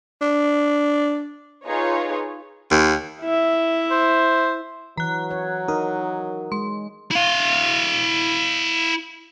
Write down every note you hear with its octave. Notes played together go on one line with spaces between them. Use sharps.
D4
D#4 F4 G#4 B4 C#5
D#2
E4 E5
C5
E3 F#3 A#5 F#6
C#5
D#4 A#4 D#6
G#3 C6
E4 F5